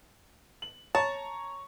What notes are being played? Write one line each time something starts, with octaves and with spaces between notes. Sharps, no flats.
F#7
C#5 A5 A#5 C#6